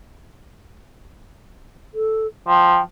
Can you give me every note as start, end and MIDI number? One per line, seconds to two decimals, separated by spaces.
1.94 2.27 69
2.48 2.78 53
2.48 2.82 79